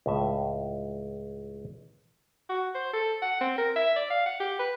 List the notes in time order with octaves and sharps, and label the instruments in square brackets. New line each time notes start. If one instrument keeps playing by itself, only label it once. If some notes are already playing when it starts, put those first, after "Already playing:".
[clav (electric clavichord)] C#2 A2 E5
[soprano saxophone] F#4
C5
A4
F#5
C4
A#4
E5
D5
F5
F#5
G4
B4